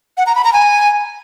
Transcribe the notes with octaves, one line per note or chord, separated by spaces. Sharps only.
F#5
A#5
B5
A#5
G#5